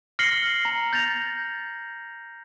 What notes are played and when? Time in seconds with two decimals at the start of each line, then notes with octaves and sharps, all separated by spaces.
0.19 F6 A#6 C7 C#7 F#7 G7
0.65 A#5
0.93 G6 A6 A#6 F7